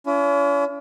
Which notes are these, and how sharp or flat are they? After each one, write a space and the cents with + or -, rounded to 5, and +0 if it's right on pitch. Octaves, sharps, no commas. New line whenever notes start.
C#4 +40 E4 +45